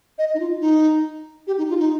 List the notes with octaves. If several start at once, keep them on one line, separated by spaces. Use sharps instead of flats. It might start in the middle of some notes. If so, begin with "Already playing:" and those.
D#5
D#4
F4
D#4
G4
D#4
F4
D#4